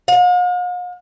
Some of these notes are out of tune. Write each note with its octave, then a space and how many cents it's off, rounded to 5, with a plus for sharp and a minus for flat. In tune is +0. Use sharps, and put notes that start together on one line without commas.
F5 +45